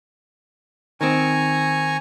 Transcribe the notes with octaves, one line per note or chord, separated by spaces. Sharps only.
D#3 C4 G#5 A#5 C#6